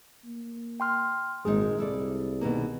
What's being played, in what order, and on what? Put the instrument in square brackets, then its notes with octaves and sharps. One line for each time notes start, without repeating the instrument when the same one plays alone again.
[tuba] A#3
[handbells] G5 C6 F6
[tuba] G#1 [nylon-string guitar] A#2 G#3 D#4 [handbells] G#4
[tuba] C2 [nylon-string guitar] E4 A4 D5
[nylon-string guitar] B2 D#3 A#3